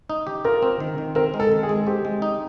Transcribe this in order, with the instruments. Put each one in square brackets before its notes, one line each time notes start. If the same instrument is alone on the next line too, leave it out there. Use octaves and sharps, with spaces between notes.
[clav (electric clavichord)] D#4
G4
[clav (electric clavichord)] F4 [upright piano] A#4
[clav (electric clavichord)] C4
D#3
D#3
[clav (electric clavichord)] C4 [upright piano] A#4
[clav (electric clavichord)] G#3
[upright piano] A4
[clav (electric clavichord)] D#3
[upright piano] G#4
[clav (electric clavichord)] G#3
[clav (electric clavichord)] C4 [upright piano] G4
[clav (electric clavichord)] G#3
D#4